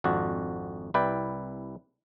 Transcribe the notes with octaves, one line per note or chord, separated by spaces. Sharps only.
G#1 F2 D4 F#4
C2 E4 B4 D5 G5